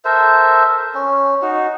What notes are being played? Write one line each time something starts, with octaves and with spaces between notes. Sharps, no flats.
A4 A#4 C5 E5
C#4
D#4 F#4